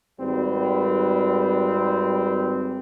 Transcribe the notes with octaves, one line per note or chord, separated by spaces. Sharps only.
G#1 G3 C4 B4